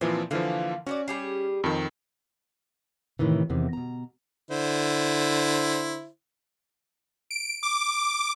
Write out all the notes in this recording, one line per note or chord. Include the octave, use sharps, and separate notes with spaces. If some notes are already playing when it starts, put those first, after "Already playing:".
A#2 E3 F3 C4
D3 E3 F3 A#3 F4
C#4 F#4 A4 D5
G3 G4 G#4
F2 D#3
A2 C3 D#3 E3
E2 C3 D#3
B2 A#5
D3 E4 C5
D7
D6